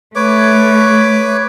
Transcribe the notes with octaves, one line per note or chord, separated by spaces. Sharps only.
A3 B4 C#5 D6